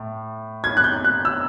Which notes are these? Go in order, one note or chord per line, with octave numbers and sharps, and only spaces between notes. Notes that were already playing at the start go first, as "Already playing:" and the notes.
Already playing: A2
G#6
F#6
G6
F#6
E6